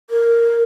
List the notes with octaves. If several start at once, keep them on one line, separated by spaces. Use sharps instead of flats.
A#4